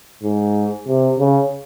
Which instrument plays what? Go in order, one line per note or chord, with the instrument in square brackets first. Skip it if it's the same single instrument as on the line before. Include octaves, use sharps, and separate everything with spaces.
[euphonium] G#2
C3
C#3